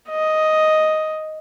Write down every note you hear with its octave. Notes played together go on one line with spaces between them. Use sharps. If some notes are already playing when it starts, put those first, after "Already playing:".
D#5